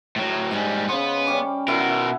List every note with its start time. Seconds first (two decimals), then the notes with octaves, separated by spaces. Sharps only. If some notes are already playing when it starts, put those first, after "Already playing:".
0.16 A2 F#3
0.51 G#2 G3 D#5 G#5
0.89 C#3 B3 C5
1.27 G3 C#4 D6
1.68 B2 E4 A#4 E5 F#5